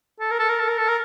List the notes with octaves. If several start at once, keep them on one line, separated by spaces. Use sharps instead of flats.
A4
A#4
A4
A#4
A4
A#4
A4
A#4